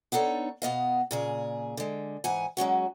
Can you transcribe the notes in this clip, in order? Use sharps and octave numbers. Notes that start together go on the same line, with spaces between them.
B3 D4 D#4 A4 C#5
B2 B3 D#5 F5
A#2 C#3 G#4
D3 G#3
G#2 E3 F#5 G#5
F#3 G#3 C#4 F#4